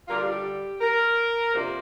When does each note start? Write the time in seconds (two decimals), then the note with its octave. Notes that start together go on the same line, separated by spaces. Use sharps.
0.08 D3 G3 D4 F4 A#4
0.16 G4
0.24 F4
0.31 G4
0.81 A#4
1.54 F2 C3 A#3 D4 F4 C5